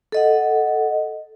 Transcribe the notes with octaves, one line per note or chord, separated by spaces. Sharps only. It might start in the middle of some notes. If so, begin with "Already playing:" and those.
A4 D#5 F#5